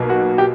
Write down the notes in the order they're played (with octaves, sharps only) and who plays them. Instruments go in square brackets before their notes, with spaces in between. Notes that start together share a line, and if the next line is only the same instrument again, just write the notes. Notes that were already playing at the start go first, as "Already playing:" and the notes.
Already playing: [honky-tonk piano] B1 B2 F#3 A#3
[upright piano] F#4
G4